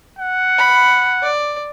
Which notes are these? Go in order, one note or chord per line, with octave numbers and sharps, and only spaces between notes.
F#5
B5
D5